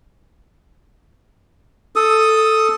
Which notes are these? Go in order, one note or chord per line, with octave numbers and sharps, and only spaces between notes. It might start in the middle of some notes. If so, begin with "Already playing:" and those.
A4 D#6